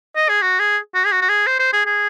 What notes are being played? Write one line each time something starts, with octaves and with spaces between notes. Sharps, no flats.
D#5
G#4
F#4
G#4
F#4
G#4
F#4
F#4
G#4
C5
C5
G#4
G#4